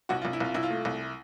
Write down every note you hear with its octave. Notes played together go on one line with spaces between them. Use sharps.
C2 F#4
F4
C2
E4
C2 F4
C2 E4
F4
A3
C2